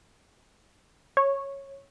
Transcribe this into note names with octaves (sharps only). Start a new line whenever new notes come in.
C#5